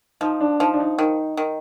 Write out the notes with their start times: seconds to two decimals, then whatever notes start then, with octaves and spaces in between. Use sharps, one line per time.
0.21 F3 D#4
0.41 D4
0.60 F3 D#4
0.74 D4
0.80 D#4
0.98 D#3 D#4
1.37 D#3